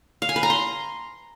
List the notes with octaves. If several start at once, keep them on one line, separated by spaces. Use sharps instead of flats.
F5
G#5
B4
A#5
C6